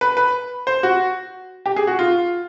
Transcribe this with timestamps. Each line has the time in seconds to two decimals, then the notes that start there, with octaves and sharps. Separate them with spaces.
0.01 B4
0.17 B4
0.67 C5
0.83 F#4
1.66 G4
1.76 G#4
1.87 F#4
1.99 F4